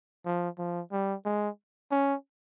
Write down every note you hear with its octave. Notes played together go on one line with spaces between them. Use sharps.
F3
F3
G3
G#3
C#4